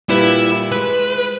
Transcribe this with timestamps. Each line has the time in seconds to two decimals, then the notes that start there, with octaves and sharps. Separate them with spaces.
0.09 A#2 G3 E4 B4
0.72 G#3 B4 F#6